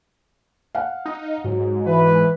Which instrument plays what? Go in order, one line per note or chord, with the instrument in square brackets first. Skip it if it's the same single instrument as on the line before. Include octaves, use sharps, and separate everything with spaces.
[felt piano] F5 F#5
[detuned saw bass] D#4
[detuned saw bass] G#2 [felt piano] F#3
[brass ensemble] E3 B4